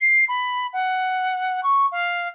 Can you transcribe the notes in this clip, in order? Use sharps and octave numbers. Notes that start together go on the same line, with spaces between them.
C7
B5
F#5
C#6
F5